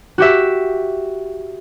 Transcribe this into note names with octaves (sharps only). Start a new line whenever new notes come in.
F#4 G4 E5